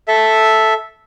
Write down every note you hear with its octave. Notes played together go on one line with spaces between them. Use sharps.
A4 E5